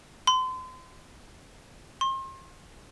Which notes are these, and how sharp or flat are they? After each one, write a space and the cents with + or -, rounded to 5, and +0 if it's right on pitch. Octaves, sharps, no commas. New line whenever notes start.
C6 -35
C6 +35